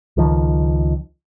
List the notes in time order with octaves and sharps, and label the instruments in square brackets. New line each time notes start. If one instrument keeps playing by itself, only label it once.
[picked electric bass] C#2 D#3 F3